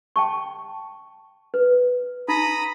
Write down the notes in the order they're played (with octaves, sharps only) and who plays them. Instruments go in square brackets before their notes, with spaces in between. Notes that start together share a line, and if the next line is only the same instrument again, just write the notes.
[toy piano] G5 A5 C#6
B4
[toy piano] D#4 [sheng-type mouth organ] A#5 B5 D#6